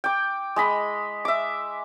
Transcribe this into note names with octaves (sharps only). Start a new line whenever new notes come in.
G5 D6
G#3 D#5 B5
E5 D6